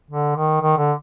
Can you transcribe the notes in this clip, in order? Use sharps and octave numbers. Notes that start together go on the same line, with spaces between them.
D3
D#3
D#3
D3